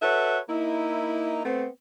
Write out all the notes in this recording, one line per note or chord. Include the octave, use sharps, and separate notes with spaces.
F#4 A4 B4 C#5 E5
A#3 D#4 E4
A3 B3 C4